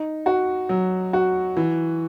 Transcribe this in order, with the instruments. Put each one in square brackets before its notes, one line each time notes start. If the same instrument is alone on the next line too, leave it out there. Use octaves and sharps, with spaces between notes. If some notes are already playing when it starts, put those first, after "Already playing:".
Already playing: [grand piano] D#4
F#4
F#3
F#4
E3